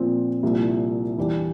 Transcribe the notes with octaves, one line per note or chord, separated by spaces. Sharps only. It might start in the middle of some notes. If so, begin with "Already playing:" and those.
Already playing: A#2 F3 C4
C2 A#2 F3 A#3 E4
E2 E3 G3 D4 G4